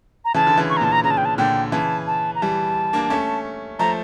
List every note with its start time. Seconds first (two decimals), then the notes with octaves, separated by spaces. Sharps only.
0.25 A#5
0.34 C#3 E3 A5
0.47 D3
0.58 C#3 E3
0.70 C#6
0.77 A#5
0.81 A#2 A5
0.92 A#5
1.03 C#3 A#5
1.11 A5
1.17 G5
1.25 A5
1.38 A#2 D3 G5
1.72 C#3 E3 A5
2.07 A5
2.35 A#5
2.42 E3 G3 A5
2.93 A#3 D4
3.10 A3 C#4
3.79 F3 A3 A#5